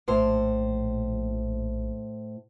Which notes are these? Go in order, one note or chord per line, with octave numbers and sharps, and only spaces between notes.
A#1 A2 C5